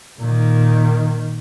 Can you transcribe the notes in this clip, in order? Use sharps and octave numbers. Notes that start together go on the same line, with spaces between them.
A#2 D#3